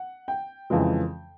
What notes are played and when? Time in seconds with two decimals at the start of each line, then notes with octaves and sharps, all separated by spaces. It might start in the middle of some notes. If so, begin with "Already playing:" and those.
Already playing: F#5
0.28 G5
0.70 F2 C#3 E3 G#3